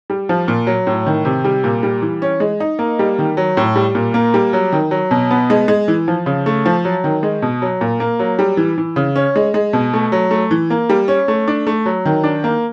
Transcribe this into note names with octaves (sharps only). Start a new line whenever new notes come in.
G3
F3
A#2
F#3
A2
D#3
C3
G3
A#2
G3
E3
C#4
G#3
D#4
A#3
G3
D#3
F#3
A2
G3
A#2
A#3
G3
F#3
D#3
F#3
B2
B3
G#3
G#3
E3
F3
C#3
A3
F3
F#3
D#3
G#3
B2
F#3
A#2
A#3
F#3
G3
E3
E3
C#3
C#4
G#3
G#3
B2
A3
F#3
A3
E3
A#3
G3
C#4
A3
D4
A3
F#3
D#3
D4
A#3